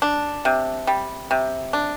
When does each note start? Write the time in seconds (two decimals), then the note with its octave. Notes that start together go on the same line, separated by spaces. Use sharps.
0.02 D4
0.45 C3
0.87 G3
1.31 C3
1.73 D4